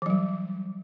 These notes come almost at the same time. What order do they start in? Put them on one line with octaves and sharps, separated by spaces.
E3 F#3 G3